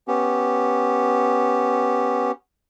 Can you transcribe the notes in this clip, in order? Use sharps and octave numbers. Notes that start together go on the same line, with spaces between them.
B3 C#4 G4